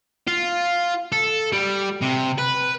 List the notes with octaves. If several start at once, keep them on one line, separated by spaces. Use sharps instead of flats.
F4
A4
G3
C3
B4